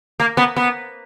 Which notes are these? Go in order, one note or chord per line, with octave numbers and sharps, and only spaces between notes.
A#3
B3
B3